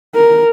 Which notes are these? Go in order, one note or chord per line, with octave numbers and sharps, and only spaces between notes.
A#4